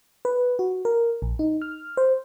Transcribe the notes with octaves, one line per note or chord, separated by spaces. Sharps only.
B4
F#4
A#4
A#1
D#4
F6
C5